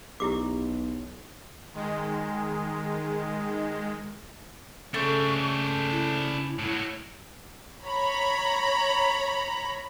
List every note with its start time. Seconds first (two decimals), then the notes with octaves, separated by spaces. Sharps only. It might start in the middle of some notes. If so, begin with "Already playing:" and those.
0.20 B1 E4 G4 D6
1.74 D#3 G#3
4.94 C#3 A3 D4 C5 C#6
5.91 E4
6.59 A2 F#3
7.86 C#5 A#5 B5